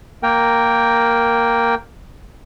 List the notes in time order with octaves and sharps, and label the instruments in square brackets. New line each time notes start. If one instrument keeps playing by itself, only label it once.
[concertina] A#3 A#4 G5